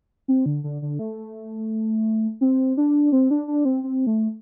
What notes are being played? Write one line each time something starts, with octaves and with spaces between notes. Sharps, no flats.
C4
D3
D3
D3
A3
C4
D4
C4
D4
D4
C4
C4
A3